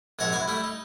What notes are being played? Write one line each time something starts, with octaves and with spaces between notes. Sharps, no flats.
A#1 G#2 C3 G#4 F#5 A#5
F#2 E4 G#5 D#6
G3 A3 E4
D#4